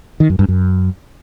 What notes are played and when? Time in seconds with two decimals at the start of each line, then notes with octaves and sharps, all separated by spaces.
0.20 D#3
0.30 F#2
0.39 G2
0.48 F#2